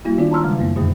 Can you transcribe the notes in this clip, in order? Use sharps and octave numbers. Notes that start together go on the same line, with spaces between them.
G3 A#3 E4 F#4
D#3 B3 D4 D#4 F4 D5
A5 A#5 C6 E6 F6
C#3 G3 G#3
F#2 A#3 B3
F2 A#2 D3 F#3 A3